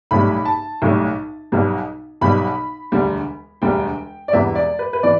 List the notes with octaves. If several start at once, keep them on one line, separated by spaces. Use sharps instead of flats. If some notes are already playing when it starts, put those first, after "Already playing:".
B1 A2 G3 B5
A5
B1 A2 G3
B1 B2 G3
B1 B2 G3 B5
E1 D2 D3 G3
E1 D2 D3 G3 G5
D5
E1 E2 E3 G3 E5
D5
B4
B4
E3 D5